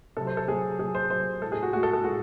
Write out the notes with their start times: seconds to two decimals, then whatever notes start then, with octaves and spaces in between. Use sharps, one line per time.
0.17 C3 F#3 A4
0.27 C5
0.37 A4
0.48 C3 F#3 G#4
0.79 C3 F#3 G#4
0.95 C5
1.10 C3 F#3 C5
1.41 G#3 A4
1.44 A2
1.52 G#4
1.63 F#4
1.73 A2 G#3 F#4
1.83 A4
1.93 A4
2.04 A2 G#3 F#4